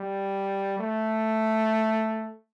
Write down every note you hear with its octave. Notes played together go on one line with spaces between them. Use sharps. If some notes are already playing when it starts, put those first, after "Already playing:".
Already playing: G3
A3